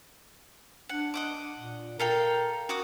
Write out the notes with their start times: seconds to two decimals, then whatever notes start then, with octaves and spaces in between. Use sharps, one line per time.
0.89 D4 F#5
1.14 D#5 F#5 D6
1.56 A#2
2.00 A4 A#4 F5 G5
2.69 F#4 D6 D#6